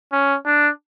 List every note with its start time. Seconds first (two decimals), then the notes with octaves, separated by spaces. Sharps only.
0.12 C#4
0.46 D4